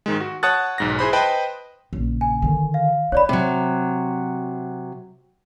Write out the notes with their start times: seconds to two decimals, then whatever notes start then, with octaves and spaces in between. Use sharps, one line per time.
0.06 G#2 D#3 G#3
0.20 F#4
0.43 C#5 F#5 A5 D#6 F#6 A6
0.78 B1 G#2 A#6
0.99 E4 G#4 C5 B5
1.13 B4 C5 D#5 G5 A5 B5
1.93 A#1 C#3
2.21 G#5
2.42 D3 D#3
2.74 F5
3.12 D#4 C#5 D5 B5
3.29 C3 F#3